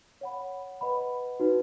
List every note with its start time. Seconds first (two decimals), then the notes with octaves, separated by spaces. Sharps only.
0.21 C#5 F#5 B5
0.81 B4 D#5 F#5 B5
1.40 D#4 F#4 B4